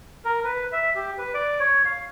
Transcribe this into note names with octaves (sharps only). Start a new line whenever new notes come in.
A#4
B4
E5
G4
B4
D5
C#5
F5